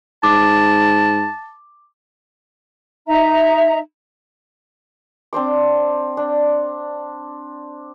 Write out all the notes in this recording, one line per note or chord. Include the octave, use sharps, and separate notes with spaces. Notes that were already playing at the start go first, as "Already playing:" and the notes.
G#2 A5 D6
D#4 E5 A#5
C4 D4 C5 D6
D4